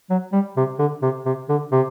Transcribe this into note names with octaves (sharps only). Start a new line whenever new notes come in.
F#3
G3
C3
D3
C3
C3
D3
C3